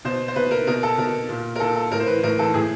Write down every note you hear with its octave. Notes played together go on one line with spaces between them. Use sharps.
B2 C5
C5
B2 B4
A#4
B2 A#4
A4
B2 A#4
A#2
A#4
A#2 A4
A4
A2 A#4
C5
E3 B4
A2 A#4
E3 A4
A2 G#4